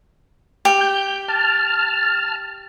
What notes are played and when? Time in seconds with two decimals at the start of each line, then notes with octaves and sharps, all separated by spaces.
0.65 G4
0.81 G6
1.28 A5 F6